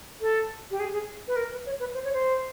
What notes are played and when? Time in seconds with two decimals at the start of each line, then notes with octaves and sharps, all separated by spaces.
0.21 A4
0.71 G4
0.80 G#4
0.93 G#4
1.28 B4
1.36 A#4
1.52 B4
1.66 C#5
1.80 B4
1.94 C5
2.04 C#5
2.13 C5